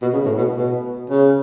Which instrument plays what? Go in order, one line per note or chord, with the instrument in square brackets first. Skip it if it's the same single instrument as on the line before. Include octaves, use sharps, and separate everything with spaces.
[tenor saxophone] B2
C#3
A2
B2
B2
C#3